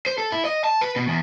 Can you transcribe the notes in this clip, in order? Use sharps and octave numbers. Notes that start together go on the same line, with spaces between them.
C5
A4
E4
D#5
A5
B4
B2
E2